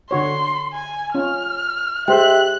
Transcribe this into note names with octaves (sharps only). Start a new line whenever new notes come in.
D3 F#4 C#5 C6
G#5
C#4 F4 F6
G#3 G4 C5 E5 G5 F#6